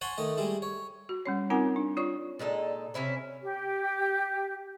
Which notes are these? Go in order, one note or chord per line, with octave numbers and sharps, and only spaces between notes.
C#5 F#5 G#5 A5 B5 C6
D#3 A3 D#5
G3 G#3 E4
C#5
F#4
G3 C#4 C#5
C4 D#4 F4 A#4 F#5 G#5
D4
F4 C#5 D5 C#6
A#2 G#3 D#4 A4
C3 C#4 E4 C#5
G4